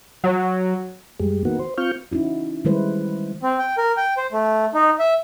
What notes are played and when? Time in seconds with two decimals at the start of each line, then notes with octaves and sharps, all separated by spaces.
0.24 F#3
1.20 F#2 G3 G#3
1.45 D#3 A#3 B3 F#4
1.59 C5
1.78 C4 F4 C#6 F6 G6
2.12 C#4 D#4 E4 F#4
2.65 D#3 G3 G#3 E4 B4 C5
3.42 C4
3.59 G5
3.78 A#4
3.97 G5
4.17 C5
4.32 A3
4.74 D#4
4.99 E5